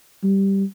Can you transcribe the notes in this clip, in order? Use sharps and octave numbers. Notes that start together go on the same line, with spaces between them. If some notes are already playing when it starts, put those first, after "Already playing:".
G3